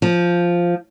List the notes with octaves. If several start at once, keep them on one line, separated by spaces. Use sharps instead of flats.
F3